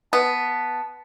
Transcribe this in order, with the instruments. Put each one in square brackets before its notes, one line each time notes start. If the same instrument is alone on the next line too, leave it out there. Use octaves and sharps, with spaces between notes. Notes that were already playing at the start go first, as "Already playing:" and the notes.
[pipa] B3 [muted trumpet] A5